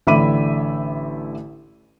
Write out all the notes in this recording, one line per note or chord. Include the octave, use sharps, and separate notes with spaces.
A1 D3 E5 B5 D6 D#7